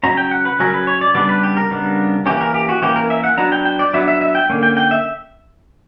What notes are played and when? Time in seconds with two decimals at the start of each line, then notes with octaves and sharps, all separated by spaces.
0.03 C#3 F#3 C#4 A#5
0.17 G5
0.31 F#5
0.45 B4
0.59 C#3 F#3 C#4 A#4
0.73 B4
0.87 C#5
1.01 D5
1.14 C#3 G3 B3 D4 D5
1.29 B4
1.43 G4
1.57 A#4
1.71 C#3 G3 B3 D4
2.26 E3 A#3 C#4 G4
2.41 A#4
2.54 G4
2.69 F#4
2.82 E3 A#3 C#4 G4
2.96 A#4
3.10 E5
3.24 F#5
3.37 F#3 B3 D4 A#5
3.52 G5
3.65 G5
3.79 D5
3.94 F#3 B3 D4 E5
4.08 E5
4.21 E5
4.35 G5
4.50 D3 A#3 C#4
4.63 G5
4.77 G5
4.91 E5